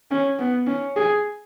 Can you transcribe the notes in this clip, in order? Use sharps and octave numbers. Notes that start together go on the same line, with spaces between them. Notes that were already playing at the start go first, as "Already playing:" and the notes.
C#4
B3
C#4
G#4